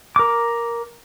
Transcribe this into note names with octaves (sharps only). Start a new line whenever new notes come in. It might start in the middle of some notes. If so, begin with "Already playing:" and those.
A#4 D6